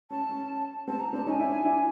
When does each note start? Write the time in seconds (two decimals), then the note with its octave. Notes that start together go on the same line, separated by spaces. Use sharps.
0.10 C#4 A5
0.30 C#4
0.88 C4 A5
1.00 A#5
1.13 C4 D4 A5
1.26 C#4 D#4 A5
1.29 G#5
1.39 D4 E4
1.65 D4 E4